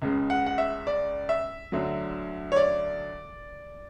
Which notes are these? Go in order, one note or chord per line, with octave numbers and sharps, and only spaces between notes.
C#2 C#3 G#3
F#5
F#5
E5
D5
E5
D2 D3 F#3
C#5
D5